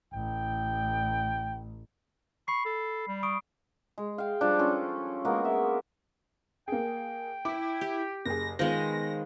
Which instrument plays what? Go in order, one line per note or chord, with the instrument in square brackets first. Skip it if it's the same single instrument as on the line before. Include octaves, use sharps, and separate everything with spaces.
[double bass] A1 [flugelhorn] G5
[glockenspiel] B5 C7 [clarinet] C#6
[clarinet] A4
G3
[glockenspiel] C#6 D#6 D7
[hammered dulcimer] G#3
F5 G5
F3 G3 D4
C#4 F4 A4
G#3 A#3 B3 F#4
E5
[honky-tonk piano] A#3 G#4 [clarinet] G5
[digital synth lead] E4 [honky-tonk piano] D6
[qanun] G4
[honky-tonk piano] F#1 G#4 [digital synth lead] A#6
[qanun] D#3 G#3 [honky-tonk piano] B3 F4 C5 [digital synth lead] A#6